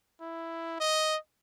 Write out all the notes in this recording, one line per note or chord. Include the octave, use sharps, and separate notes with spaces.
E4
D#5